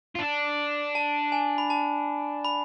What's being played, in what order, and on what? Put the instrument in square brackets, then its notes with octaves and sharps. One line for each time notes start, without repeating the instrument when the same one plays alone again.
[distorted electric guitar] F4
D4
[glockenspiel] A5
G#5
B5
A5
B5